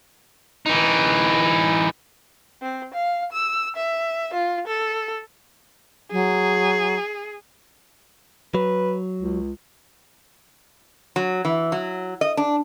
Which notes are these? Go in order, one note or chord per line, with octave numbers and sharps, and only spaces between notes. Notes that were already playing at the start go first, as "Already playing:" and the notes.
E3 D#4
C4
F5
E6
E5
F4
A4
F#3 G#4
F#3 B4
C#2
F#3
E3
F#3
D#5
D4